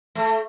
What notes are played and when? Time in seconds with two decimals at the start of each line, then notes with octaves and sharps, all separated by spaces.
0.15 A3